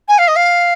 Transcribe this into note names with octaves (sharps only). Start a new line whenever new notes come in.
G#5
F5
D#5
F5